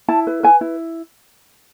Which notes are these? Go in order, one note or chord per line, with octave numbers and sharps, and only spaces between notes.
E4 A5
B4
B4 G#5
E4